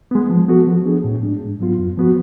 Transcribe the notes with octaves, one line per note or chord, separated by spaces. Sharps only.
G#3 B3
F3
B3 F#4 A4
F3
B3 D4 G#4
A2
G#3 D4
G#2
F#3 B3 F4
F#2
F3 B3 F#4